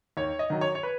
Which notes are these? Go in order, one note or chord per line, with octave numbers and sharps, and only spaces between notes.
D#2 C#5
D#5
D#3 F#3
C#5
C#5
B4